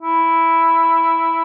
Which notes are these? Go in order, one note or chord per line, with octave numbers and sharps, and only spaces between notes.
E4